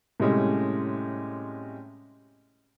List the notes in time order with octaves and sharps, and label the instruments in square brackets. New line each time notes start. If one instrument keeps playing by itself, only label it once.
[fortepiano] A2 C3 G3 G#3 C#4